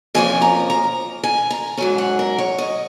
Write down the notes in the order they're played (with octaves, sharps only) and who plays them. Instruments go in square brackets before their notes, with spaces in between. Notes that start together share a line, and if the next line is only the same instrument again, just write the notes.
[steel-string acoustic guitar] F2 F3 A#3 C#4 G#5
A#5
A#5
G#5
A#5
G#2 F#3 C#4 G#5
F#5
A#4
C#5
D#5